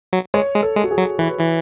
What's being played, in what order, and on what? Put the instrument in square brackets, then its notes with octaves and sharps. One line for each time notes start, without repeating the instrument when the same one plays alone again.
[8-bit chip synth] F#3
[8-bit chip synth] G#3 [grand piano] C#5
[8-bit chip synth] G#3
[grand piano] A4
[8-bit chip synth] G#3
[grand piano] F#4
G#4
[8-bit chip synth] F#3
[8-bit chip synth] E3 [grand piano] B4
[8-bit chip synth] E3